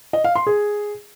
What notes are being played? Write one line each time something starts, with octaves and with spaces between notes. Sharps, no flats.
D#5
F5
C6
G#4